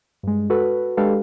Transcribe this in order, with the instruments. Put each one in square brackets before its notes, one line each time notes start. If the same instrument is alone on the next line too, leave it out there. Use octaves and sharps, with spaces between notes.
[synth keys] G2 G#3
F#4 A4 B4
G#3 D4 G4 A4 B4 F5